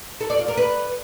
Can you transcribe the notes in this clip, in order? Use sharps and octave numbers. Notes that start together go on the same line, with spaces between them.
A4
D5
F4
A#4
B4